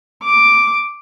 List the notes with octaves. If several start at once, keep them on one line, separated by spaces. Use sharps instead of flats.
D6